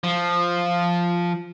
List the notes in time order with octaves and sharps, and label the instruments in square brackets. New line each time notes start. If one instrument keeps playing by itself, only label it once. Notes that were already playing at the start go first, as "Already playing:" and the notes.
[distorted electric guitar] F3